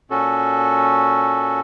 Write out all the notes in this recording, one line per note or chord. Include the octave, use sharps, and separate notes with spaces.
A#2 C#4 F#4 A4